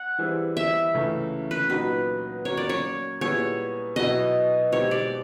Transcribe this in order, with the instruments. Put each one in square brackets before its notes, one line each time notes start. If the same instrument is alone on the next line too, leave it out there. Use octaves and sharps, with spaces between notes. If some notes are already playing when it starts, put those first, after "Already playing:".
Already playing: [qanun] F#5
[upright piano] E3 G3 C4 E4 G#4
[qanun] E5
[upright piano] C#2 C#3 E3 A3
[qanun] B4
[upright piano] A#2 F#3 B3 D#4 F#4 [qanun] B4
[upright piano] F#3 A#3 C#4 [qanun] C#5
[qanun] D5
C#5
[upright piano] A#2 G3 B3 E4 G#4 [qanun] C#5
[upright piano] B2 F#3 B3 E4 [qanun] D#5
[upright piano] B2 G#3 C4 D#4 G4 [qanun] C#5
[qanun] D5